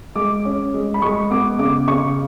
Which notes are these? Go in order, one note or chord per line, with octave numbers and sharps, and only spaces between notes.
G#3 D6
C#4
G#3
B5
G#3 C#6
B3 D6
C#3 D6
C#3 C#6